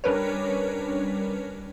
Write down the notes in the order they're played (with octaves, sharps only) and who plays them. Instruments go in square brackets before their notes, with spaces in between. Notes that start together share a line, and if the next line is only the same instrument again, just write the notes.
[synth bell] G3 C#4 D4 A#4 B4 C#5